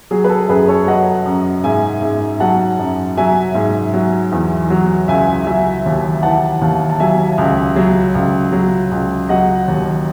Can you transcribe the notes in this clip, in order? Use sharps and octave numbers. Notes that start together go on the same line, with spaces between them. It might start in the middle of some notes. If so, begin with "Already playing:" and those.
F#3 G#4
B4
A4
F#2 G#4 B4
A4 C#5
F#3 D#5 F#5
F#2
G#2 E5 G#5
G#2
F#3 F#5 A5
F#2
F#3 E5 G#5
G#2
F#3
E2
F#3
C#2 E5 G#5
F#3 E5 G#5
D#2
E3 F#5 A5
D#2
A5
F#3 E5 G#5
C#2
F#3
C#2
F#3
C#2
F#3 D#5 F#5
D#2